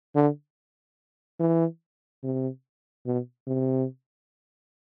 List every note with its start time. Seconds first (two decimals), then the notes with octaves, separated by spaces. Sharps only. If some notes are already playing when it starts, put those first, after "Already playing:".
0.15 D3
1.40 E3
2.23 C3
3.06 B2
3.47 C3